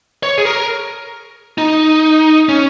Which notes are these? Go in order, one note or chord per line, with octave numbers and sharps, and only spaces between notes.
C#5
G#4
A#4
D#4
C#4